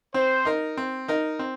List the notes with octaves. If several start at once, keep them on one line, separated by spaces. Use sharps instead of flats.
C4 C5
D#4 A#4
C4
D#4 A#4
C4